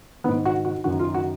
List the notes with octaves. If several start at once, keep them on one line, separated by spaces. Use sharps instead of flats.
G#2 D#3 B3
F#4
F#4
F#2 D#3 F#4
F4
F#4